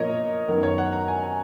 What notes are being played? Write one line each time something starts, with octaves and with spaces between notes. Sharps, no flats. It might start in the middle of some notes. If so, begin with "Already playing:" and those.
Already playing: A#2 F3 B3 A#4 C#5 D#5
F#2 D#3 F#3 B3 A#4
C#5
F#5
A#5
G#5
G#5